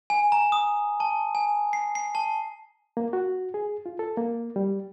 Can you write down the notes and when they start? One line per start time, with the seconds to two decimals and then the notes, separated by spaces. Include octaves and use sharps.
0.10 G#5
0.32 A#5
0.52 D#6
1.00 A5
1.35 G#5
1.73 C7
1.95 C7
2.15 A5
2.97 A#3
3.13 F#4
3.54 G#4
3.86 F4
3.99 A4
4.18 A#3
4.56 G3